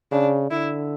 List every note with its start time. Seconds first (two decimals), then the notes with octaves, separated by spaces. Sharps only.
0.12 C#3 D4
0.51 D3 E4